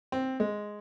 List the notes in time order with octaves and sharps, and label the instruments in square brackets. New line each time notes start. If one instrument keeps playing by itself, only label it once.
[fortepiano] C4
G#3